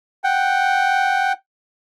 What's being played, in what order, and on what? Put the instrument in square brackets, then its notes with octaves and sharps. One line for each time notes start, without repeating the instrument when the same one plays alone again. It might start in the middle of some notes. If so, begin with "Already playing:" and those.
[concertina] F#5 G5